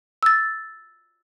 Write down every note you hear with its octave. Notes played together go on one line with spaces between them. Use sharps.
E6 A6